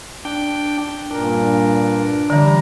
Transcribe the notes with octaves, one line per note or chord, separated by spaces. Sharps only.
D4 G5
G2 A#2 D4 A#4
D3 E3 G3 A#5